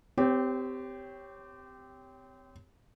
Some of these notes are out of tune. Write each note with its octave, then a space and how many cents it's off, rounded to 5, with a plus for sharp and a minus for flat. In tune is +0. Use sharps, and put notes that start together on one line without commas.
C4 -30 G4 +0 C#5 +0